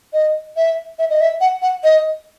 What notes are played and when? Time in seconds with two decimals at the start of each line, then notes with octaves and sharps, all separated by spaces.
0.13 D#5
0.57 E5
0.99 E5
1.10 D#5
1.21 E5
1.41 F#5
1.62 F#5
1.84 D#5